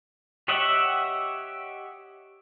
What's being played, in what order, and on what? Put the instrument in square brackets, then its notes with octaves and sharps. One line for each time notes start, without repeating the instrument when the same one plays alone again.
[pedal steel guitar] G4 C#5 D#5 E5 F#5